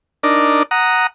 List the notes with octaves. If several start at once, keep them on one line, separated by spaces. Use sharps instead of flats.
D4 D#4 A#4 D5
F#5 A#5 D#6